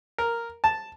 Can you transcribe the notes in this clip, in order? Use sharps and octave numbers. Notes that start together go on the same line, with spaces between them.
A#4
A5